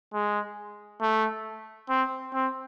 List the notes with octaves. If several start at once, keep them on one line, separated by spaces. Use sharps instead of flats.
G#3
A3
C4
C4